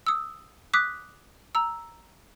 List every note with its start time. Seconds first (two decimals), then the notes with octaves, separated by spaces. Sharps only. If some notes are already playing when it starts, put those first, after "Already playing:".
0.07 D#6 E6
0.74 D6 D#6 F#6 B6
1.55 A#5 E6